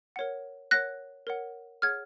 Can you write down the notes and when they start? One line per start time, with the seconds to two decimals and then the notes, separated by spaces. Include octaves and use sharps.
0.16 A#4 C#5 F#5
0.71 A#4 C#5 F#5 F#6 A#6
1.27 A#4 C#5 F#5
1.82 G#4 C#5 F#5 F6 G#6